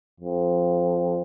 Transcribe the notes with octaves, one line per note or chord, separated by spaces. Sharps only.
F2